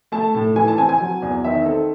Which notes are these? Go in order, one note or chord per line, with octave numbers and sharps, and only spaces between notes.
A3 A5
A2
E3 G#5
A5
C4 G#5
G#5
F#3
E2
D#3 E5
C4 A4